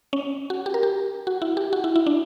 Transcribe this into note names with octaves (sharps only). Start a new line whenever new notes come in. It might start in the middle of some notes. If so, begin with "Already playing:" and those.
C#4
F#4
G4
A#4
G4
F#4
E4
G4
F#4
E4
E4
D4